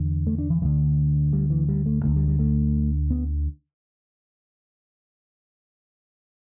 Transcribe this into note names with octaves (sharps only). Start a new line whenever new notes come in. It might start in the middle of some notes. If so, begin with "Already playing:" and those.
Already playing: E2 D3
A3
D4
E3
D2 D3 E3
G3
E3
G3
A3
D2 D3 A3
G3
G3
A3
B3